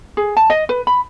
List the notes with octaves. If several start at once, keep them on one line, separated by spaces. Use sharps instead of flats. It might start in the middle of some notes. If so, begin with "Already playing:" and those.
G#4
A5
D#5
B4
B5